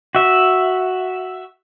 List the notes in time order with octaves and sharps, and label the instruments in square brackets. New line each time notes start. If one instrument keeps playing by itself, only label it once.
[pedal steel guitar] F#4 E5